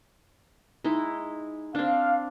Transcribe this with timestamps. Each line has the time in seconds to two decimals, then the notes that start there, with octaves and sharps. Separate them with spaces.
0.84 G#3 D#4 E4
1.75 C4 D4 F5